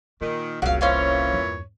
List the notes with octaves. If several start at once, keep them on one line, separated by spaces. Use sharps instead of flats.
A#2 D#3 A#3
F1 C2 A#2 C#3 F#3 F5 F#5
A#2 E3 C#4 C5 C#5 F5
E2 G2